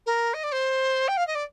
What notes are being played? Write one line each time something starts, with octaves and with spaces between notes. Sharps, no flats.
A#4
D#5
D5
C5
G5
F5
D#5
D5